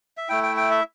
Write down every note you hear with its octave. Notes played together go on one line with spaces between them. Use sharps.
E5
A3 E4 G5
G5
G5
E5